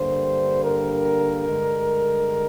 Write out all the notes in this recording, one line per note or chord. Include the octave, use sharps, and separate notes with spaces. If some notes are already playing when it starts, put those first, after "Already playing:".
Already playing: G2 D3 G3 A#3 C5
A#4
G2 D3 G#3